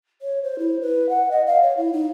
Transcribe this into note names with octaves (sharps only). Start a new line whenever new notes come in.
C#5
C5
E4
B4
F#5
D#5
F5
C#5
E4
D#4